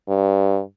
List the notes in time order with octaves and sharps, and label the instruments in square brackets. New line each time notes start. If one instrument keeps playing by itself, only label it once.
[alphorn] G2